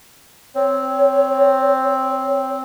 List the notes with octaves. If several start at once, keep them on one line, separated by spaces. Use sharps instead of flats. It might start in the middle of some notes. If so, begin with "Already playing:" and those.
C4 C#5